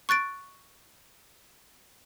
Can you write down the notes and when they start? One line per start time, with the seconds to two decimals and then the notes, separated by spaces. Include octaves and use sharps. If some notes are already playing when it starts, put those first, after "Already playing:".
0.09 C#6 F#6 A6 D7